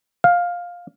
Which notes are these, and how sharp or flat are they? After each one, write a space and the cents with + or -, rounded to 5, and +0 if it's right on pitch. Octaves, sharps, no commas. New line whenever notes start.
F5 +10